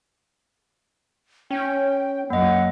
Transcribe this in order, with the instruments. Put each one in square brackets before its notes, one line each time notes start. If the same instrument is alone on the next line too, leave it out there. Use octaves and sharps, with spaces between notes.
[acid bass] C#4 [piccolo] G5
[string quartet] F#2 [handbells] A#3 D#5 [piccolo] F#5